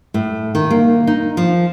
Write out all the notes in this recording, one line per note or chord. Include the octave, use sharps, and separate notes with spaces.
A2
D#3
A#3
D#4
F3